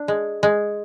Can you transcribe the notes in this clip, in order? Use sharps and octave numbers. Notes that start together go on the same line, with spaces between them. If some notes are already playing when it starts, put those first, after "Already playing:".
Already playing: D4
G#3
G#3